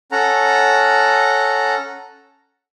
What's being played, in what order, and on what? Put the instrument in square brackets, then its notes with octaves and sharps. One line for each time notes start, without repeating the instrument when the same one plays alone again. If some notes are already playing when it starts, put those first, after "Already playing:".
[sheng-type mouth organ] C#4 A4 F#5 A#5